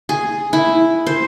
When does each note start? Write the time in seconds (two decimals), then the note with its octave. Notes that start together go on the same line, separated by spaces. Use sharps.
0.09 G#4
0.53 E4
1.07 C5